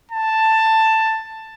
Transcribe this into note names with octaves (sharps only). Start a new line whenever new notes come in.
A5